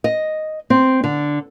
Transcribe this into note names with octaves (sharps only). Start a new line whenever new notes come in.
D#5
C4
D3